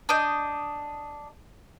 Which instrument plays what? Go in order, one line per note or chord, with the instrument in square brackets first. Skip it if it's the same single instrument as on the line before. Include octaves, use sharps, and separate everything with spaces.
[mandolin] D4 D#5 G6